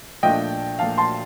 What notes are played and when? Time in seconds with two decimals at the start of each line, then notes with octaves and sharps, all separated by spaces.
0.23 A#2 F3 A3 D4 D#5 G5
0.79 A#2 F3 A3 D4 F5 A5
0.98 A5 C6